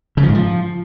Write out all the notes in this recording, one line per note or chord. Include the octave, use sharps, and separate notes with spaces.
C#3
F3
G#2
F3